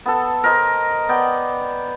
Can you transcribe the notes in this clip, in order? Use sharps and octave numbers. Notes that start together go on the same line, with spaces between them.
B3 A4
A#4 C5 D#5
B3 D5 G5